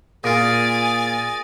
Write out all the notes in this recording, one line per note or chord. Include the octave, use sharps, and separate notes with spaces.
A#2 F4 G#4 G#5 D#6 A6 A#6 D7